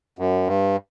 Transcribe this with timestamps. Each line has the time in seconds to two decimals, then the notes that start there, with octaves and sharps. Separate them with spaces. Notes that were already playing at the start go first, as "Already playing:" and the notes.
0.19 F#2
0.47 G2